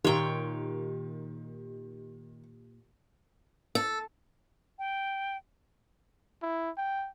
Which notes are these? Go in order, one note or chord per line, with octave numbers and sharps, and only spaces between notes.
A#2 D#3 F4 G4 C#5 G5
A4
G5
E4
G5